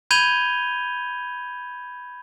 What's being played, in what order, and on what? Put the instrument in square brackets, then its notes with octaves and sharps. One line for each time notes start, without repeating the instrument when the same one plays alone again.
[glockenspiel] B5 G6 G#6 D#7 F7 G7